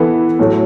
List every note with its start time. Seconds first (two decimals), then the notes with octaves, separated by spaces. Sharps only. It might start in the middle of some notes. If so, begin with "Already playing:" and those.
Already playing: E3 B3 E4 A4
0.39 A2 F#3 A3